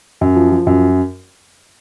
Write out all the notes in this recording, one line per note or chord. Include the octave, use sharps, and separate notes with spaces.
F#2
F3
F3
F#2